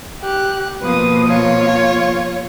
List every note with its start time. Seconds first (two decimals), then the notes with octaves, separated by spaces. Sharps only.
0.22 G4 F#6
0.82 B2 F3 A#3 B4 D#6
1.29 F4 C#5